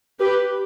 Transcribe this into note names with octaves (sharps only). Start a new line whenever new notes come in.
G4 B4